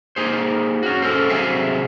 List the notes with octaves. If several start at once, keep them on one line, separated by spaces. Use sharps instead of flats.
A#3 D#4 G#4 C5
C#4 F#4
C#4 A4 A#4 C5
C3 F3 F#3 G#4 E5 F5